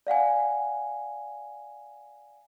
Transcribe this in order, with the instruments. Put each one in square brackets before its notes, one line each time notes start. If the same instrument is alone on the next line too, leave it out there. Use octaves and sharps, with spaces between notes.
[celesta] D5 F5 F#5 G#5